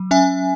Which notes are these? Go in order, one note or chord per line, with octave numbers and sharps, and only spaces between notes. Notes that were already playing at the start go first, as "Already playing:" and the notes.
Already playing: F#3
C#4 E5 G#5